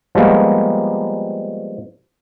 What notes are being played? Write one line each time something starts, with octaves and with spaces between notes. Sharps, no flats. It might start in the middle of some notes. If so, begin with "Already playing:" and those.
F3 G3 G#3 A#3 B3